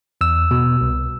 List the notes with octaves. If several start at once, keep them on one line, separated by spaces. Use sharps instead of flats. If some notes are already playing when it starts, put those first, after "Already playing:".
E2 E6
B2
C2